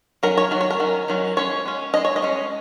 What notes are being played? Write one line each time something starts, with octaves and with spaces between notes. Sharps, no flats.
D#3 F#3 C#4 A#4
C#5
D#3 F#3
C#5
A#4
D#3 F#3 C#4
D#3 F#3 C#4
G#3 C#4 C#5
G#3 C#4
G#3 C#4 D#5
C#5
D#5
G#3 C#4